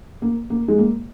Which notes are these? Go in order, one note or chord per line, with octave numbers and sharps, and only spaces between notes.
A#3
A#3
G#3
A#3